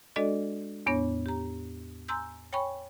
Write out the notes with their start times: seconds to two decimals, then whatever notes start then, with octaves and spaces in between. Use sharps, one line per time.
0.16 G#3 D4 F#4 A4 D5 D#5
0.86 E2 A2 B3 D4 C#5 A#6
1.26 G4 A#5
2.08 G#5 A#5 C6 E6 G6
2.53 C#5 G5 G#5 B5 C#6